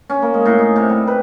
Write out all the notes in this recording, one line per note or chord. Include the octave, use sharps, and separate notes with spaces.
C#4
A#3
G#3
A2
D#4
C3
G3
B4